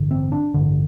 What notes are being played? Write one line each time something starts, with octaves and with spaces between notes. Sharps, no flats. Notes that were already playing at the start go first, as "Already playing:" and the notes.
Already playing: A1 G2 D3
C4
D4
A1 G2 D3